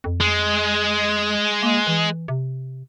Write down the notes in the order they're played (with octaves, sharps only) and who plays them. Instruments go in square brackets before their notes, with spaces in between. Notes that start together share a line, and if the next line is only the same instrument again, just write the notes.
[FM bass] F2
[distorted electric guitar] G#3
[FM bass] A#3
E3
C3